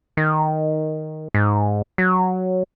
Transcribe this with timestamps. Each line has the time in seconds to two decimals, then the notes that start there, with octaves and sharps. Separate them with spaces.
0.17 D#3
1.34 G#2
1.98 F#3